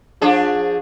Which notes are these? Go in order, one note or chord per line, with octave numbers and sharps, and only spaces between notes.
F3 D4 G#4